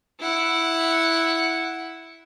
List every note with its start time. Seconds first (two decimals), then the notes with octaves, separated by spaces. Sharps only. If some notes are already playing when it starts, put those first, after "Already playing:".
0.20 E4 F#5